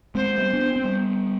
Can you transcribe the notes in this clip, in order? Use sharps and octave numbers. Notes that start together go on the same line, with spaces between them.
G#3 C4 C5
G3 B3
B3 D4
C4
G3 B3